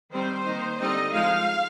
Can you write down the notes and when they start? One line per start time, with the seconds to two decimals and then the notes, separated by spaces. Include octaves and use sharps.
0.12 D#3 G3 C4 D#4 C5
0.46 D#3 A#3 D#4
0.79 D3 G3 C4 D#4 D#5
1.13 F3 G#3 D#4 F5